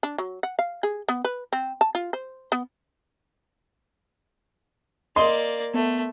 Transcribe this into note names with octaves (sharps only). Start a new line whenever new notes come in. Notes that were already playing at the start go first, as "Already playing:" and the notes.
D4
F#3
F#5
F5
G#4
B3
B4
C4
A5
F4
C5
B3
A#3 D5 D#5 C6
A3 B3